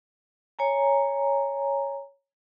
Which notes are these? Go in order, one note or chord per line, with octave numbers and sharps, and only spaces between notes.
C#5 G#5 A#5